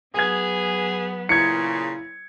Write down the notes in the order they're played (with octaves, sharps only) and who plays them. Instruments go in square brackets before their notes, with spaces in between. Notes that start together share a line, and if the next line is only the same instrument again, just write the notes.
[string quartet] F#3 B3 [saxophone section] G#4 [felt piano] G#5 G#6
[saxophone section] A#2 C#3 [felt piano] E4 [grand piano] G#6 C#7